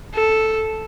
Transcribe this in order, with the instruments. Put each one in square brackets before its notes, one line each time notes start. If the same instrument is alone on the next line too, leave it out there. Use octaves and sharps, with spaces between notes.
[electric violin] A4